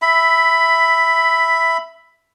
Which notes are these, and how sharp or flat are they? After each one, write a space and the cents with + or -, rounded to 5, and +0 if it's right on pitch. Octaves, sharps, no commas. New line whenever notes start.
E5 +0 B5 +10